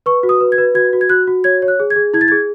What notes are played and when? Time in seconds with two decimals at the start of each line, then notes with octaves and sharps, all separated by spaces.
0.06 B4 C#6
0.23 F#4
0.29 D#6
0.41 B4
0.52 G#6
0.58 B4
0.75 F#4 G#6
0.93 F#4
1.01 G#6
1.10 F#4 F#6
1.27 F#4
1.44 C#5 G#6
1.62 C#5
1.68 F#6
1.80 G#4
1.90 G#6
1.96 G#4
2.14 E4 G#6
2.21 A6
2.28 G#6
2.32 G#4